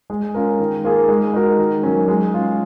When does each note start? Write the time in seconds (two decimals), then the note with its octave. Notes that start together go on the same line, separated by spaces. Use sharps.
0.10 G#3
0.34 C#4 F4 A#4
0.60 D#3
0.84 A#3 F4 G#4
1.08 G#3
1.33 D#4 F#4 A#4
1.58 D#3
1.83 F#3 A#3 C#4
2.08 G#3
2.34 C#4 F4